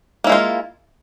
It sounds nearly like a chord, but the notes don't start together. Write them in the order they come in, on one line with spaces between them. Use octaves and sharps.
A#3 E4 G#3 F4